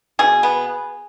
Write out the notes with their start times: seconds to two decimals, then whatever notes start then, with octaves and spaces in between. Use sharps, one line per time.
0.19 B2 G#4
0.43 B3